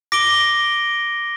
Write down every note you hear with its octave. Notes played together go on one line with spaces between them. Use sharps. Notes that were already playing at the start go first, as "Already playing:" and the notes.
D6 A#6 D7 G7